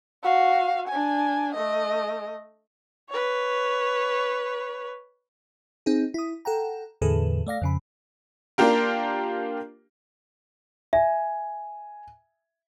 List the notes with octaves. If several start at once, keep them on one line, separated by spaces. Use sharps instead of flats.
F#4 F5
D4 G#5
A3 D#5
B4 C#5
C4 D#4 G#4
E4 D#6
A4 F#5 G5 A#5
E2 A2 D3 G#4 A4 B4
A3 D5 F5 A#6
F2 C#3 B5
A#3 D4 F4 G4 A#4
E5 G#5